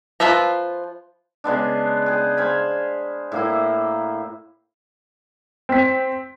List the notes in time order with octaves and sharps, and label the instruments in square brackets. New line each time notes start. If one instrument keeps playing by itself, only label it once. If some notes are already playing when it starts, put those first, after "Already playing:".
[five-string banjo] F3 F4 B4 E5 A#5
[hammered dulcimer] C#3 G#3 B3 D4
G#4 G5
C5 F5 G#5 B5
A2 A#3 E4
[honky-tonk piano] C4 B6